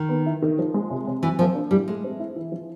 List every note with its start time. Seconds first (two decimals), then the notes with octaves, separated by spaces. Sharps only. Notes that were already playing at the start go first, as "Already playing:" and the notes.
Already playing: D#3
0.09 B3
0.26 E4
0.42 D#3
0.59 F3
0.74 G#3
0.90 C3
1.07 C3
1.22 E3 F#3
1.39 F3 A#3
1.54 D4
1.71 A2 G3
1.88 G#3 A3
2.04 C4
2.20 E4
2.36 E3
2.52 F3